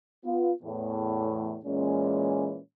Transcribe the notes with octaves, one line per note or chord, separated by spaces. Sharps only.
B3 F4
E2 A2
A#2 E3 G#3 C#4